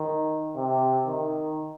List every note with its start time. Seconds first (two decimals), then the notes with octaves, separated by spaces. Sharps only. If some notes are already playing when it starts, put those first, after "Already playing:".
Already playing: D#3
0.56 C3
1.06 D#3